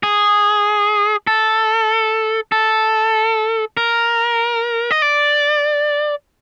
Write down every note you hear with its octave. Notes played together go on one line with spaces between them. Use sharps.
G#4
A4
A4
A#4
D#5
D5